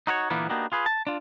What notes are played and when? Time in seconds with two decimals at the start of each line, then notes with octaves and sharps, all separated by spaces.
0.07 D#4 F#4 A#4 C#5
0.30 A#2 D3 E3 A#3 B3
0.49 A#3 B3 D4 D#4 F#4 G4
0.72 F4 G#4 B4
0.86 A5
1.07 D4 F4